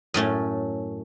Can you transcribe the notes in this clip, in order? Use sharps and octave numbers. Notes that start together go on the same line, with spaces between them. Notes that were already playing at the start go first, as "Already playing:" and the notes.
F#2 A2 A3 C#4